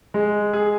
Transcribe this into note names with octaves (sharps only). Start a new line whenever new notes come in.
G#3
G#4